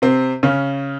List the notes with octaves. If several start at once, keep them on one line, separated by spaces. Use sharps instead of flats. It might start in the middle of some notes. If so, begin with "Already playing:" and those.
C3 C4
C#3 C#4